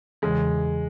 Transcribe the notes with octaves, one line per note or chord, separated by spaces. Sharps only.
E2 C#3 E3 G#3